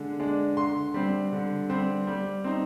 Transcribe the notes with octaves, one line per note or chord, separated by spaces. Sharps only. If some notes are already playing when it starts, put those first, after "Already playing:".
Already playing: D3 G#3 D4
G#3 D4
D3 C6
G3 C4
D3
G3 C4
G3
C4 D#4